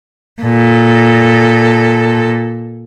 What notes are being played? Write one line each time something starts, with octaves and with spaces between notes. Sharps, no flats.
A#2 A4